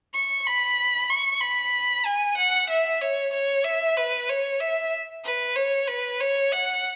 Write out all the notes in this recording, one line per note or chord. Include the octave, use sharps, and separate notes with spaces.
C#6
B5
C#6
B5
G#5
F#5
E5
C#5
C#5
E5
B4
C#5
E5
B4
C#5
B4
C#5
F#5